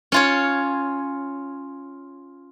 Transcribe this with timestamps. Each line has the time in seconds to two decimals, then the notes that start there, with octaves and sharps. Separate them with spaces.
0.12 C#4 F4 C#5